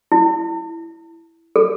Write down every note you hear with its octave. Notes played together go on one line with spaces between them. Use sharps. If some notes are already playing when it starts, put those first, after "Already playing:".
E4
A4